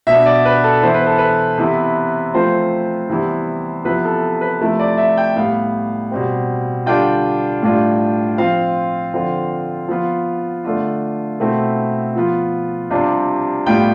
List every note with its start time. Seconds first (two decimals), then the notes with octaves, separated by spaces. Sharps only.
0.07 B2 B3 D4 E5
0.26 D5
0.45 B4
0.64 A4
0.83 E3 B3 E4 C5
0.94 B4
1.06 A4
1.18 B4
1.58 C3 E3 B3 E4
2.34 F3 A3 C4 F4 C5
3.09 C3 E3 G3 B3 E4
3.84 C3 F3 B3 E4 B4
4.04 A4
4.41 B4
4.60 C3 F3 A3 E4
4.79 D5
4.97 E5
5.17 G5
5.36 A2 G3 B3 F5
6.11 B2 G3 C4
6.86 D3 G3 D4 F4 G5
7.62 A2 G3 D4 F4
8.38 F3 C4 F4 F5
9.14 D3 F3 C4 F4
9.88 F3 B3 F4
10.65 D3 A3 D4 F4
11.40 B2 A3 C4 E4
12.15 F3 B3 F4
12.90 C3 G3 D4 F4
13.66 A2 G3 B3 F4 G5